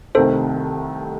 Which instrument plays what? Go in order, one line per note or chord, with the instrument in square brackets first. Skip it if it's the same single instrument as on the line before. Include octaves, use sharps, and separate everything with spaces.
[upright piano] C2 C3 D#3 A3 [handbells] A4 C5